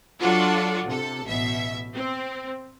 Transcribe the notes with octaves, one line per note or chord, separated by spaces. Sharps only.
F#3 D4 F4 F#4 A4
C3 A4
A1 B2 E5
C4